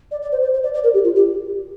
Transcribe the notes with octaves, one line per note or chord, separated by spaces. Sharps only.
D5
D5
C5
C5
C5
D5
D5
A#4
G4
F4
G4